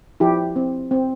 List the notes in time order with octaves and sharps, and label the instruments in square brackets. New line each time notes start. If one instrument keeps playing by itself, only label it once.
[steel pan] F3 E4 G4
C4
C4